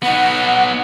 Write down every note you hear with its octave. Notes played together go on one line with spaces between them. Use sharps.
B3 D#4 F#5